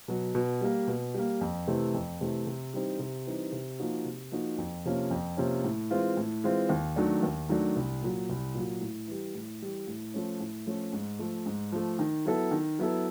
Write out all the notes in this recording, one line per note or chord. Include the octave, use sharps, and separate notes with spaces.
B2 F#3
B2
G3 A#3
B2
G3 A#3
F2
C3 E3 A3
F2
C3 E3 A3
C3
E3 G3 C4 D#4
C3
E3 G3 C4 D#4
C3
F3 A#3 D#4 F#4
C3
F3 A#3 D#4 F#4
F2
C3 F3 A#3 C#4
F2
C3 F3 A#3 C#4
A2
E3 G#3 C4 F4
A2
E3 G#3 C4 F4
D#2
D#3 F#3 A3 D4
D#2
D#3 F#3 A3 D4
C2
A#2 F#3
C2
A#2 F#3
A2
E3 G3
A2
E3 G3
A2
F3 A3 C#4
A2
F3 A3 C#4
G#2
F3 A3
G#2
F3 A3
D#3
F#3 B3 E4 A4
D#3
F#3 B3 E4 A4